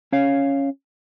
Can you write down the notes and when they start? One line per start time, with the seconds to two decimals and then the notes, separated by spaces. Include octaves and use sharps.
0.12 C#4 C#5 F5